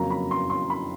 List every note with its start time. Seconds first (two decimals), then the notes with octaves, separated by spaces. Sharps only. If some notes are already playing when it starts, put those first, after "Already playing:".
Already playing: F2 C#3 F#3 A#3 C#4 A#5
0.10 B5
0.31 C6
0.50 C6
0.70 B5